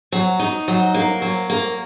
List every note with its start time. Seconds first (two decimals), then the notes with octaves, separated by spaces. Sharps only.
0.12 F#3
0.39 D#4
0.68 F#3
0.94 A#3
1.22 F#3
1.50 A#3